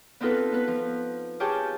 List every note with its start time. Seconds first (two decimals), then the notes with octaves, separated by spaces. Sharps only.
0.21 B3 C4 D#4 F4 A4 B4
0.52 B3 B4
0.68 F3
1.40 F4 G4 G#4 C#5 G5 A5